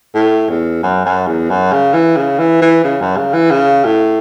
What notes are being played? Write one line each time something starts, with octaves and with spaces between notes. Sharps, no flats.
A2
E2
F#2
F#2
E2
F#2
C#3
E3
C#3
E3
E3
C#3
F#2
C#3
E3
C#3
A2